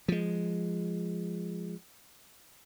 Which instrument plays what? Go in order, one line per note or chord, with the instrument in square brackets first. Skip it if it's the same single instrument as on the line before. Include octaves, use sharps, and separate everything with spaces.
[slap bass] F3 G#3